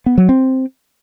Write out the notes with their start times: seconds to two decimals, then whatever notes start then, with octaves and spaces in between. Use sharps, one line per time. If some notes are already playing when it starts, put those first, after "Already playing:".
0.06 B3
0.18 F#3
0.29 C4